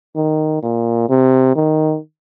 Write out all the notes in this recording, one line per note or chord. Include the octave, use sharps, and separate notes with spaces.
D#3
A#2
C3
D#3